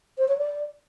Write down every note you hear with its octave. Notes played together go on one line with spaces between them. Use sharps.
C5
C#5
D5